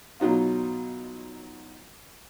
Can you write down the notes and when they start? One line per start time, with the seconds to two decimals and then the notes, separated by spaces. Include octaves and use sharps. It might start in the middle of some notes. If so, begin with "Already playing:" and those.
0.20 B2 F#3 D#4 F4